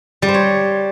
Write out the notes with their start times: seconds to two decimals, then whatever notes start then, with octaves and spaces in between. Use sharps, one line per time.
0.22 G3
0.28 C5
0.34 C#5